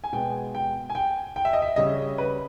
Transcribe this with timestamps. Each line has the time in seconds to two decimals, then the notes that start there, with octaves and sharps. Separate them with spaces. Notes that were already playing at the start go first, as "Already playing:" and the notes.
0.04 G#5
0.13 B2 G#3 B3 G5
0.55 G5
0.90 G#5
0.95 G5
1.36 G5
1.45 E5
1.53 D#5
1.62 E5
1.76 C#3 G3 C#4 D#5
2.18 B4